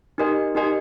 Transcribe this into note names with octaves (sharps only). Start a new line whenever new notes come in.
D#4 G4 A#4 D#5 G#5
D#4 G4 A#4 D#5 G#5